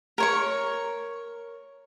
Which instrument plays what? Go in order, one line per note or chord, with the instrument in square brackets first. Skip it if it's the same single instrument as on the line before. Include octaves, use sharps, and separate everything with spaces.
[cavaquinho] A#4 C#5 C#6